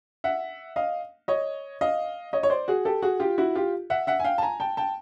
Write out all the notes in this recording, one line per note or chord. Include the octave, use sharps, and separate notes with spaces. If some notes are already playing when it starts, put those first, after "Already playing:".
E5 F#5
D#5 F5
C#5 D#5
D#5 F5
C#5 D#5
C#5
C5 D5
F#4 G#4
G4 A4
F#4 G#4
F4 G4
E4 F#4
F4 G4
E5 F#5
E5 F#5
G#5
F5 G5
A5
G#5 A#5
G5 A5
G5 A5